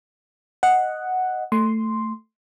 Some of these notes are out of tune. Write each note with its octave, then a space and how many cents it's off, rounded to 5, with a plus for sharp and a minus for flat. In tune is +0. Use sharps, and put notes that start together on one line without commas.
D#5 +0 F#5 +0
A3 +10 C6 +0